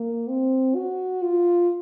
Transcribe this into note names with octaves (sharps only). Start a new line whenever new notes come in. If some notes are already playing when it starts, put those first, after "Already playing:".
Already playing: A#3
C4
F#4
F4